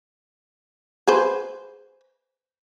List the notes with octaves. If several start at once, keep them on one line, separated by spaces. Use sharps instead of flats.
G#4 B4 C5